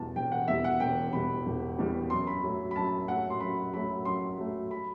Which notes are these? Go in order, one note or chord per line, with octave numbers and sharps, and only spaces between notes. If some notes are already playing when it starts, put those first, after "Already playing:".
Already playing: E1 E2 B2 G3 A5
E1 G5
F#5
E2 B2 G3 E5
F#5
E1 G5
E2 B2 G3 B5
E1
E2 B2 G3
F#2 C6
B5
F#3 A3
B5
F#2 A5
F#3 A3 F#5
C6
F#2 B5
F#3 A3 B5
F#2 C6
F#3 A3
B5